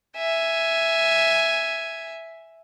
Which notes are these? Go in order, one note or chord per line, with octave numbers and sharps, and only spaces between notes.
E5 G#5